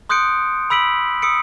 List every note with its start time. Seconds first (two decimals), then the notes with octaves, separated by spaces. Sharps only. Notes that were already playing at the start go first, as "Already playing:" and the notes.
0.09 C6 D#6 F#6 G6 C#7 D7
0.70 B5 E6 B6 D7 F#7
1.22 D#6 E6 C#7 D7